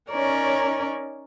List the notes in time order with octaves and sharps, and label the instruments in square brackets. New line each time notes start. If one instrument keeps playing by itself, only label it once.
[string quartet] C#4 D#4 A#4 C#5 D5